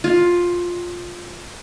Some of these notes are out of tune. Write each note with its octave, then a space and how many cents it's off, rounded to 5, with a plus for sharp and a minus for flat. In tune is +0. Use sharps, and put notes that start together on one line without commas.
F4 +10